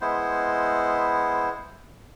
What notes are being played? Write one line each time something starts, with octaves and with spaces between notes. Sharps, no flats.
G#3 B3 E4 C5